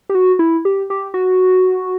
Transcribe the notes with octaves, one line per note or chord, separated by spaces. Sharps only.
G4
F#4
E4
G4
G4
F#4